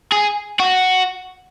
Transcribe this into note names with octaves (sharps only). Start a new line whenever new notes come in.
G#4
F#4